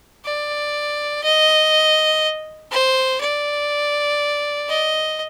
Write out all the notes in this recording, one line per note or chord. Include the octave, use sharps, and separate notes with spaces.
D5
D#5
C5
D5
D#5